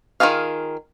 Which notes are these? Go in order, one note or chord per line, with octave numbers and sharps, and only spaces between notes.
D#3 E4 F4 G#4 F5